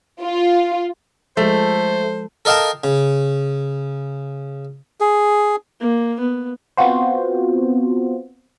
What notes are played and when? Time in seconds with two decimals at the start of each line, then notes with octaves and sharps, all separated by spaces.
0.22 F4
1.37 F3 G#3 A3 C5
2.45 A4 A#4 D#5 F5 G5 A5
2.84 C#3
5.00 G#4
5.81 A#3
6.20 B3
6.77 B3 C4 F4 F#4 C5